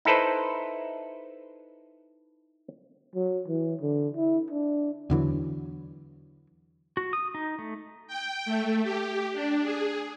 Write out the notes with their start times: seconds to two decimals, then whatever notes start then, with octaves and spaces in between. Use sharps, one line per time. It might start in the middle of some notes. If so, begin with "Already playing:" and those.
0.05 D#4 E4 A4 B4 C5
3.15 F#3
3.48 E3
3.81 D3
4.17 E4
4.50 D4
5.10 E2 D3 E3 F#3
6.97 F#4
7.13 D#6
7.35 D#4
7.59 A3
8.08 G5
8.46 A3
8.84 G4
9.33 D4
9.63 G#4